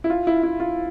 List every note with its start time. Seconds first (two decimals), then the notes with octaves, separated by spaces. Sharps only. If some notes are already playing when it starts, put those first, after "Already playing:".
0.04 E4
0.10 F4
0.27 E4
0.43 E4
0.60 F4